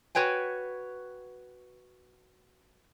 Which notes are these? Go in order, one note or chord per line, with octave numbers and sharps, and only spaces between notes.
F#4 B4 C#5 G5 G#5